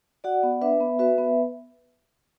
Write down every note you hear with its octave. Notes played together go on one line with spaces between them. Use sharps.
F#4 D5 F#5
B3
D4 B4 E5
B3
F#4 B4 E5
B3